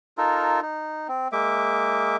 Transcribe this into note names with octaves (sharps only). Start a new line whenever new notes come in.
D#4 F4 A4 A#4
D#4
C4
G#3 A#3 E5 D6